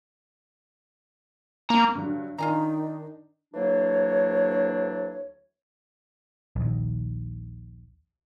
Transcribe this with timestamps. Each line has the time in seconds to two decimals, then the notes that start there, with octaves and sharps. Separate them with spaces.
1.70 A#3 A#5
1.95 G2 D3 F#3
2.38 D#3 D4 D#4 F4 G#5 A#5
3.54 D2 E3 F#3 A#3 D4 C#5
6.56 A#1 D#2